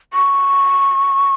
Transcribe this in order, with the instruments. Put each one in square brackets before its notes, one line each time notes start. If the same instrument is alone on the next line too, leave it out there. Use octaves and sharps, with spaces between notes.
[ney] C#6